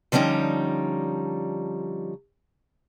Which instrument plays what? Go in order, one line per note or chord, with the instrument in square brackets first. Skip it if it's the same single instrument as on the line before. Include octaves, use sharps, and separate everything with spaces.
[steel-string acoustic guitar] D3 F3 G3 C#4 D#4